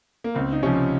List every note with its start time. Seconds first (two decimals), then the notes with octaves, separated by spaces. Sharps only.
0.24 A#3
0.35 C#2 C4
0.52 D#4
0.63 C3 F3 C#4